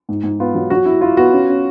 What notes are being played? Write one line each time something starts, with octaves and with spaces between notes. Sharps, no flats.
G#2
G#2
B3 F4
F#3
F#3 F#4
E4
E4 F4
B3 F#4
C#4
C#4